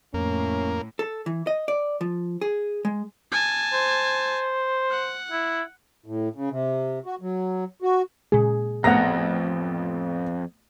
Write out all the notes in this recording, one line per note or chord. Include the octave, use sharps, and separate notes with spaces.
F2 A2 A#3 C#4
A4
E3
D#5
D5
F3
G#4
G#3
G#5 A5
C5
F#5
E4
A2
C#3
C3
F#4
F#3
F#4
A#2 C#3 G#3 G#4
A1 F2 B3 F#5 A#5 A#6